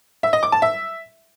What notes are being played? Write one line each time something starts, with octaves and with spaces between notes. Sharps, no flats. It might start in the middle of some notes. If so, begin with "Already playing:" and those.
E5
D#5
D6
A5
E5